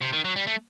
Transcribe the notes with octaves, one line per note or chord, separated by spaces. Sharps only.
C3
D#3
F#3
G3
A3